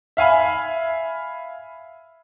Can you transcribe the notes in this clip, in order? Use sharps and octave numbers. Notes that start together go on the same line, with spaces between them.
E5 F5 G#5 B5